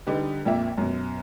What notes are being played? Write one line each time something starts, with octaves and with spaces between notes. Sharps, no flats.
D3 G3 D#4 G4 B4
A#1 F2 A#3 E5
F#2 B2